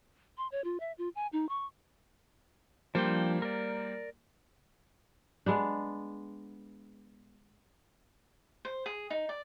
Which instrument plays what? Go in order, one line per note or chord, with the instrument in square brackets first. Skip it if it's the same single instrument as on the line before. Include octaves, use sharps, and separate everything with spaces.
[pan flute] C6
C#5
F4
E5
F4
G#5
D#4
C#6
[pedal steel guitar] F3 D4 G5 [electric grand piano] G3 A#3 C5
[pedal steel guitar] A#4 D5
[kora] G#3 B3 D4
[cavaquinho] C5
G#4
D#4
D5